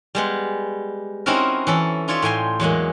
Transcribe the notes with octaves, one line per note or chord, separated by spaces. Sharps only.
G3 G#3 B3
C4 C#4 D#4 E4 F#4 A#4
E3 C#4 A4
D#4 F4 C#5 D5 E5
A2 G5 G#5 C6
E2 F#3 G#3 A#3